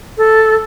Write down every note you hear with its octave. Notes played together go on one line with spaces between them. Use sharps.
A4